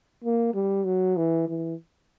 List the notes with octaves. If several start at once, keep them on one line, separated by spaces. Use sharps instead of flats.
A#3
G3
F#3
E3
E3